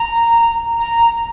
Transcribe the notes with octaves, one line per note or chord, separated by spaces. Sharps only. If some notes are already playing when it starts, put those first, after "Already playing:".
Already playing: A#5
A#5